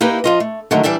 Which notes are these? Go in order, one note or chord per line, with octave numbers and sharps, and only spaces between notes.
A#3 D#4 E4 G4 B4
F3 F4 D#5
A3
D3 D#3 F#3 A3
E3 G3 D4 D5 E5